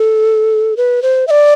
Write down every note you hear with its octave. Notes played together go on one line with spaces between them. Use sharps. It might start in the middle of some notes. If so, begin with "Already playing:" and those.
Already playing: A4
B4
C5
E5
D5